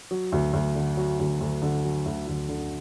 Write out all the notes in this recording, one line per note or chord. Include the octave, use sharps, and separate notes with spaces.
F#3
D2
D2
D3
F#3
D2
D2
D3
F#3
D2
D2
D3